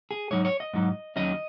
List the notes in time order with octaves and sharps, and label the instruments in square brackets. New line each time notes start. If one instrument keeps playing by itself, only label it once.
[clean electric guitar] G#4
G#2 F#3 D#4 C#5
C#5
D#5
G#2 F#3 D#4
D#2 D#3 F#3 C#4 D#5